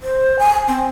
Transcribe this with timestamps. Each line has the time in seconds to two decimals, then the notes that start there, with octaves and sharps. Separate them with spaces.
0.02 C5
0.39 G#5
0.68 C4